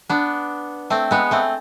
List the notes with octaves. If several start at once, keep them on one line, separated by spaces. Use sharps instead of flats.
B3 D4
A3 C4
G#3 B3
A3 C4